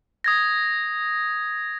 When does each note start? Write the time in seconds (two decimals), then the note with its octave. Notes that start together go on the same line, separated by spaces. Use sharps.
0.24 D#6 G#6 A#6